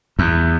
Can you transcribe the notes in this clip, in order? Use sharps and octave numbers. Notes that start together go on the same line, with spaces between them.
E2